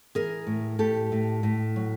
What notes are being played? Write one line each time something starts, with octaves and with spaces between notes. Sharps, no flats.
E3 G#4 A#4
A2
A2 G4 A4
A2
A2
F#3